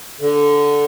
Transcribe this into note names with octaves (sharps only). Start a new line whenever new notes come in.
D3